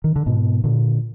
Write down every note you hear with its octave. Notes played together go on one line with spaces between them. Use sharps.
D#3
D3
G#2 B2
A#2 D3